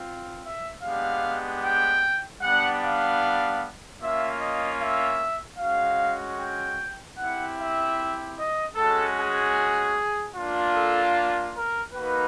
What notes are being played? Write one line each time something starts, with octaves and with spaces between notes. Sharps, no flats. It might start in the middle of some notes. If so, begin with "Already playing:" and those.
Already playing: C4 F4
E5
G#3 B3 D4 G4 F5
G5
G3 B3 D4 F#5
F5
A#3 C#4 F4 E5
D#5
E5
G#3 C#4 F#4 F5
G5
C4 E4 G4 F#5
E5
D#5
G#3 C#4 F#4 A4
G#4
A#3 D4 F4
A4
A#4
A#3 D#4 F#4 B4